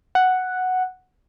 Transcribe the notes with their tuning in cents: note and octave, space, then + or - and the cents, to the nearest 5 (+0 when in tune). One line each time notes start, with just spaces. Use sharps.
F#5 +0